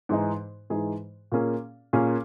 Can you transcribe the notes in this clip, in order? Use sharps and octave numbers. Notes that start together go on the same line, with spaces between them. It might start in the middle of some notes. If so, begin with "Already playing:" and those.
G#2 E3 G#3 D#4 G#4
G#2 E3 G#3 D#4 G#4
A#2 A#3 C#4 G#4
A#2 A#3 C#4 G#4